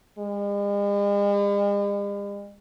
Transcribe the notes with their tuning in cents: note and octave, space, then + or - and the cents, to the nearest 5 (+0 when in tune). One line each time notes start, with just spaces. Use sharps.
G#3 -45